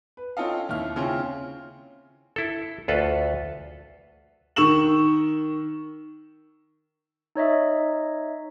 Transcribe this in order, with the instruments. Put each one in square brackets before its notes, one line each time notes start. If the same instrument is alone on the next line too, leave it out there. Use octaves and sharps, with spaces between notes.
[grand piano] B4
C4 C#4 F4 A4 D#5 F5
D#2 E4 F6
C#3 C4 C#4 E4 F4
[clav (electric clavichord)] E4 A4
D2 F4 A4 B4
[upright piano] D#3 C#6 E6 E7 F#7
[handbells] D#4 C#5 D#5 E5